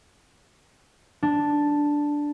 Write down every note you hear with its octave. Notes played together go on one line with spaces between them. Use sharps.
D4